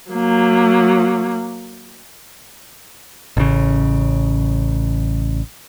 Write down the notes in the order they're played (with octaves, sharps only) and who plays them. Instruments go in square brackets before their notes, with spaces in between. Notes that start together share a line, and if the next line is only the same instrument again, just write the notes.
[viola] F#3 A#3
[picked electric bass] A1 C#3